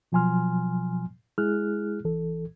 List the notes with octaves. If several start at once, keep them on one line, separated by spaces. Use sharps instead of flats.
B2 F3 F#3 G#5 C6 F6
G#3 E4 G#4 F6 F#6
C2 E3 A4